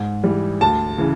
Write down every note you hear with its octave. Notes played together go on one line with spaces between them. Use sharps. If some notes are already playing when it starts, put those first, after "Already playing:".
Already playing: G#2
E3 G3
D2 A5
C#3 E3